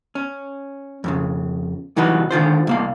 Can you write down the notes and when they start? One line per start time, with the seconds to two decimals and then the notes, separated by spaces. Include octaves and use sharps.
0.15 C#4
1.04 F2 A#2 C#3
1.96 C2 E3 F#3 D#4 F#4 B4
2.31 D3 D#3 F4 C5
2.67 C2 A#3 F5